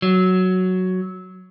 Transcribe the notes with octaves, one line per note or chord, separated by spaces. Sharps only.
F#3